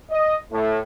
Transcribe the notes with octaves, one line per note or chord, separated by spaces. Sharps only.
D#5
A2